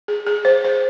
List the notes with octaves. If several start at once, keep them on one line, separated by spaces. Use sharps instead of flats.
G#4
G#4
C5
C5